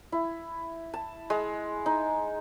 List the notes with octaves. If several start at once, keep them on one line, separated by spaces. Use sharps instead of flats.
E4
A5
G#3
D#4